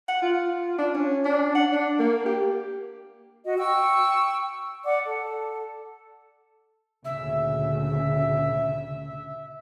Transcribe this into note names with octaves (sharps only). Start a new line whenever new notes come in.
F#5
F4
D4
C#4
D4
F#5
D4
A#3
G4
F#4 D#5
G5 C#6 E6
D5 F#5 D6
A4
D2 A#2 C#3 E5